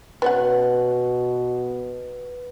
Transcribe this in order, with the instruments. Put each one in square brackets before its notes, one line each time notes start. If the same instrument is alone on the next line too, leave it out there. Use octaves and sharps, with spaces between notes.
[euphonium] B2 [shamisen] B3 C#4 F#5 [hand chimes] B4